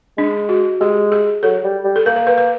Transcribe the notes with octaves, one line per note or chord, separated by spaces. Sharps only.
G#3 D4
F#4
G#3 G4
G#4
F#3 A4
G3
G3
A4
A#3 A#4
A#4
B4
B4